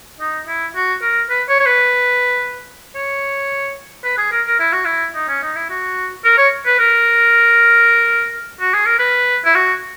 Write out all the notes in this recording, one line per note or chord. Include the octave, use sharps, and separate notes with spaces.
D#4
E4
F#4
A#4
B4
C#5
C#5
B4
C#5
B4
G#4
A#4
A#4
E4
F#4
E4
D#4
C#4
D#4
E4
F#4
A#4
C#5
B4
A#4
F#4
G#4
A#4
B4
E4
F#4